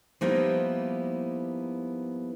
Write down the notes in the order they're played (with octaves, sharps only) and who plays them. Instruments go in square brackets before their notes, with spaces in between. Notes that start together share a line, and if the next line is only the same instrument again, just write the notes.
[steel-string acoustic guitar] F3 G3 A#3 B3 D#4 E4